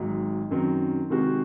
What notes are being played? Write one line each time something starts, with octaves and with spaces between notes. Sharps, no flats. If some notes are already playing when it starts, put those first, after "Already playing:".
Already playing: G#1 G#2 F#3
F#2 D#3 F#3 C4
C3 D#3 G#3 C4 F#4